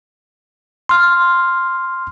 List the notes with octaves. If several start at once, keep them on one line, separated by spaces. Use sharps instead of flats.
C6 F6